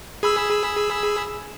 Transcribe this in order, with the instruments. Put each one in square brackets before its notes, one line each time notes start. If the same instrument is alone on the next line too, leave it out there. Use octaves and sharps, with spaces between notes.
[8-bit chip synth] G#4 B5 E6